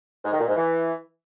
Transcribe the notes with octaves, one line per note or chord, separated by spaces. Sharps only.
G#2
D#3
A#2
G#2
E3